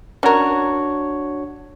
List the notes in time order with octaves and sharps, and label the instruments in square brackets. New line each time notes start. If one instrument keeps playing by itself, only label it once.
[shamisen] C#4 A#4 [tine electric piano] D4 F#4 C#5